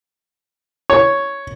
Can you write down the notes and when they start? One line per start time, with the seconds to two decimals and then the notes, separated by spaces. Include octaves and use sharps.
0.90 C#5